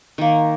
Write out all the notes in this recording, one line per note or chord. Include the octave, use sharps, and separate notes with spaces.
D#3 A#3